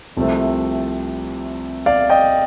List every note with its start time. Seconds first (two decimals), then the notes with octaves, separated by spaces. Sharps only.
0.17 C2 C3 F3 A3 C4
1.86 D5 F5
2.10 D#5 G5